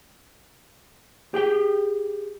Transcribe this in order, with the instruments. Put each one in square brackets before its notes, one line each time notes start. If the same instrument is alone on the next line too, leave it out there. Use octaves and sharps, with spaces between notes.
[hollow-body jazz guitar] G4 G#4 G5